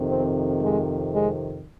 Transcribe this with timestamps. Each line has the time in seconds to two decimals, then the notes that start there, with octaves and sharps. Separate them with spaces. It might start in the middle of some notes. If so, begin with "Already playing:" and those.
Already playing: F2 C3 D#3
0.09 C4
0.61 G#3
1.13 G#3